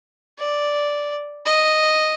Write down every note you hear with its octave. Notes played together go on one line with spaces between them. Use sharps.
D5
D#5